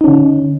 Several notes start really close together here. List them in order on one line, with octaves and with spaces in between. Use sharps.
D#4 C#4 D3